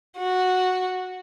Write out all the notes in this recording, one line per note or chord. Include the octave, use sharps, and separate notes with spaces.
F#4